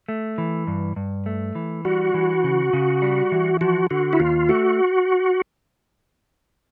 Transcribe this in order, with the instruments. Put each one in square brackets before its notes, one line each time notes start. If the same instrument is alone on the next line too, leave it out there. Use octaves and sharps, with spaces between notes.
[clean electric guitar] A3
E3
G2
G2
A3
E3
[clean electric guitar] G3 [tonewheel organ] F#4
[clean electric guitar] E3
C#3
C#3
G3
E3
[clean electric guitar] F3 [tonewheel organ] F#4
[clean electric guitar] D3 [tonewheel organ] F#4
[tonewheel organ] E4
[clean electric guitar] D#2 [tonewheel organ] F4
[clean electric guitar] A3 [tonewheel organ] F#4